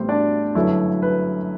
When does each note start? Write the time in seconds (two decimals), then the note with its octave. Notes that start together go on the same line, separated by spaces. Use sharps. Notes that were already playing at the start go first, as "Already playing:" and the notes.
Already playing: A1 A2 G3 B3 C4 C5
0.09 D4 D5
0.55 G1 F#2 D3 F#3 A3 E4 E5
1.02 B4